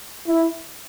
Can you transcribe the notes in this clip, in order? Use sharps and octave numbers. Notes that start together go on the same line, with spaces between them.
E4